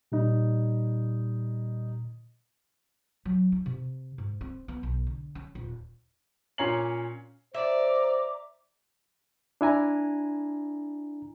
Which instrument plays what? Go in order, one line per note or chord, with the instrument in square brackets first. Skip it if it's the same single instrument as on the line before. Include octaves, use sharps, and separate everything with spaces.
[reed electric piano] A#2 [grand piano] G3 D#4
[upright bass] F#3
D#4
C3
G#2
C4
B3
B1
D3
C#4
D#1
[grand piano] A#2 C#4 C#5 A#5 C7 F#7
[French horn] C5 [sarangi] D5 [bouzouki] E5 [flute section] A#5 D6
[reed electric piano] D4 E4 G#5 A#5